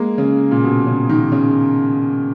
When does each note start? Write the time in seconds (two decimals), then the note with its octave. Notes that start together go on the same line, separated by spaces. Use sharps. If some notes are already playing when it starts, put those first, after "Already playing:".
Already playing: G#3 A#3
0.18 C#3
0.51 A#2
0.64 B2
0.87 C#3
1.09 D#3
1.32 C#3